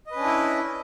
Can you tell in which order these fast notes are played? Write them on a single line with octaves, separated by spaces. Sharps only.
D#5 B4 C#4 D4 E4